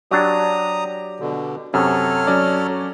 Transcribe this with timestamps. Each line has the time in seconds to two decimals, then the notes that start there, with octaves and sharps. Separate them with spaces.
0.11 F#3 D4 G4 A#5 D#6
1.20 B2 D3
1.74 F#2 C3 A4 C#5 F6
2.27 F#3 C#4 D5